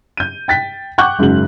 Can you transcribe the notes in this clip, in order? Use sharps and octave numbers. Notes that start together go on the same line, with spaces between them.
G6 D#7
G5 A6 B6
F#5 G5 C#6 D6 F#6 G6
F#1 G#2 C#3 F#4 F#7